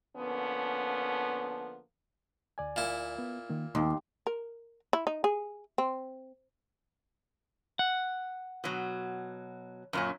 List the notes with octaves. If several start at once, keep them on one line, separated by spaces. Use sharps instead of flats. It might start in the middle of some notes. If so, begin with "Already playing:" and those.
D3 F3 A#3 B3 C#4
D2 D5 G#5
A#2 E4
B3
D#3 A#3
D#2 D#5 C6
A#4
E4
D#4
G#4
C4
F#5
B2 F#3
F#2 A#2 C#4